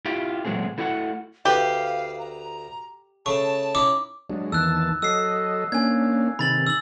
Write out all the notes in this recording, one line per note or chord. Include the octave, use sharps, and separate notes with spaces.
E4 F4 G4
A#2 F#3 G#3 A3 C4 G#4
A3 E4 F#4 F5 F#5
D2 G4 B4 F5
A#5
C#3 A3 A5 C#6
C#4 D#4 E4 D6
F#3 G#3 D4
E2 D#3 A5 E6 F#6
F#3 A4 D#5 E6 C7
A#3 C#4 D4 G#5 G#6
C3 D#3 B5 A6 F#7
E6 F#7